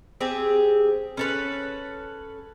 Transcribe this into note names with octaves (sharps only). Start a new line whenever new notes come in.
C4 G4 G#4
C#4 A4 B4